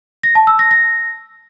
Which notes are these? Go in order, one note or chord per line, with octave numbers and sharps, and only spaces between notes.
A#6
A5
E6
A#6
A#6